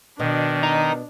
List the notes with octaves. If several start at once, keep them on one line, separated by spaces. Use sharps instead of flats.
B2 D#3 D4
D#4